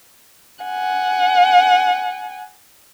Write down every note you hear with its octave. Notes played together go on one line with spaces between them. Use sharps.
F#5 G#5